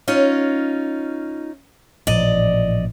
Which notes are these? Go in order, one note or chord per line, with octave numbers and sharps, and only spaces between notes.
C#4 D#4 F4
A1 A#2 F3 D5 D#5